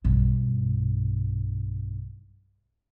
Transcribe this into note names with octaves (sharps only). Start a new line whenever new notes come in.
B1 G2